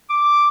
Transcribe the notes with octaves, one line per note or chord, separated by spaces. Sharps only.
D6